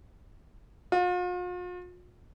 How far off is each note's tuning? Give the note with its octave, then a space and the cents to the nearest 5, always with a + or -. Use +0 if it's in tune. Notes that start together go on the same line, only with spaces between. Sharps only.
F4 +45